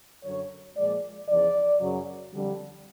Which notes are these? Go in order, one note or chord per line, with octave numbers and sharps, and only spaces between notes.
F#2 D3 F#3 C#5
A#2 F3 G#3 D5
E2 C#3 F3 D5
F#2 C#3 F#3
F2 D3 G3